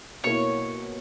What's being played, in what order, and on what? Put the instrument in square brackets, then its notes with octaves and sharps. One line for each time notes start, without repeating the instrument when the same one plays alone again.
[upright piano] B2 A#3 E4 [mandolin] C#5